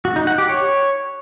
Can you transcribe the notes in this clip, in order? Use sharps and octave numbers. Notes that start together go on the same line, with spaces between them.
F#4
D#4
F#5
G4
C#5